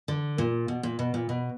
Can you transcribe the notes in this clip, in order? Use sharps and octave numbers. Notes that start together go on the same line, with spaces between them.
D3
A#2
B2
A#2
B2
A#2
B2